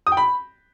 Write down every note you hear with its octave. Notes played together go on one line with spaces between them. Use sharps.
D#6
G5
B5